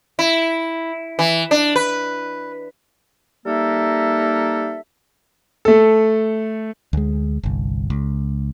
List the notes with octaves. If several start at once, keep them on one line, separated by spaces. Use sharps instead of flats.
E4
E3
D4
B4
G3 A#3 D#4 A4 A#4 E5
A3 A4
D2 G#3
G1 C2
C#2